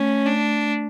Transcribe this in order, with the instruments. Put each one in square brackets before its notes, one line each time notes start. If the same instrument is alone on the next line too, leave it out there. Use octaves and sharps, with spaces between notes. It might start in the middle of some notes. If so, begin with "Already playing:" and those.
Already playing: [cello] A3 [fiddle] C#4
[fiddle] D4